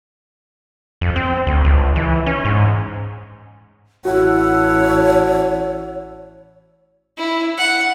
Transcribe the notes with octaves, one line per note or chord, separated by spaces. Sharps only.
F2
C4
D2
C#2
E3
C#4
G#2
A1 E4 F#4 A4 C#5 F#5
E4
F#5